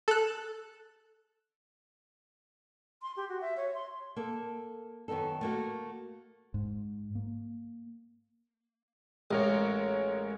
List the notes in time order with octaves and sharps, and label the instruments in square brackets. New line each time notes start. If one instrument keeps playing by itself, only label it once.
[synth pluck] A4 F#6
[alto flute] C6
G4
F#4
E5
C#5
C6
[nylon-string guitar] A#3 A4
F#2 D#3 B3 D#4 A4
A3 A#3 F#4
[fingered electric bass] G#2
A#3
[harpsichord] A1 [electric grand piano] G#3 A#4 C#5